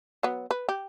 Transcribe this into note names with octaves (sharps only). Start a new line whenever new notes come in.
F#3 B3
B4
G4